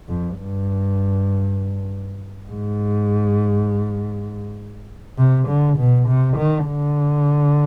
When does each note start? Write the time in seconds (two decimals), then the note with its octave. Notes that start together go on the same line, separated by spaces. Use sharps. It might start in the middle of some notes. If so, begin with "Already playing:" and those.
0.08 F2
0.39 G2
2.49 G#2
5.18 C3
5.48 D3
5.78 B2
6.08 C3
6.37 D#3
6.68 D3